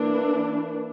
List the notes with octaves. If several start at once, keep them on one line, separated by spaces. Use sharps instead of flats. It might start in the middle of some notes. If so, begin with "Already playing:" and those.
Already playing: E3 A#3 D4